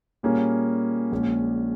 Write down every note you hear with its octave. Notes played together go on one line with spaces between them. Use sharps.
A#2 G3 A#3 C#4 G#4
A#1 A#2 G#3 C#4